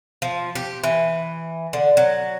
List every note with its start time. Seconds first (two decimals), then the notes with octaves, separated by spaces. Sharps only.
0.22 F3
0.55 G4
0.83 E3
1.73 D3
1.97 F#3